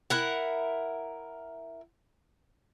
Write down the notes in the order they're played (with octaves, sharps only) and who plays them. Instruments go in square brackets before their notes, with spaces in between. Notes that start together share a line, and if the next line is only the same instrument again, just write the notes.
[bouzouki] E4 A#4 F#5